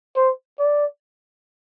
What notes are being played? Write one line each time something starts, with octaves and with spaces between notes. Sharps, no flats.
C5
D5